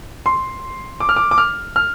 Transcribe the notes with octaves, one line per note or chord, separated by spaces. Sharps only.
C6
D6
F6
D6
D6
F6
F6